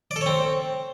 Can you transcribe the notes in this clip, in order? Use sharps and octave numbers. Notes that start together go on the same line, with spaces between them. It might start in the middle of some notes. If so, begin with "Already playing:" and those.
D5
A4
C#5
C4